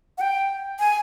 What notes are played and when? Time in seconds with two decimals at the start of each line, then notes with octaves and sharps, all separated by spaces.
0.18 F#5
0.21 G5
0.80 G#5